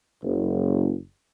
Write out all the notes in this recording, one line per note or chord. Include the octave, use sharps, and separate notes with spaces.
F#1